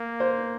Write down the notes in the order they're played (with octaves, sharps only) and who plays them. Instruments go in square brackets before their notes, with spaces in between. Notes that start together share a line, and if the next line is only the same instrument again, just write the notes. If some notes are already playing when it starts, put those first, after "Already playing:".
Already playing: [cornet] A#3
[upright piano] C5